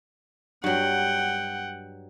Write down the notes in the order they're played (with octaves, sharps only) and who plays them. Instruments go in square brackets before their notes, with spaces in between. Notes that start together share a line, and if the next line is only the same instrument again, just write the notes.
[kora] G2 F#3 [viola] F#5 G5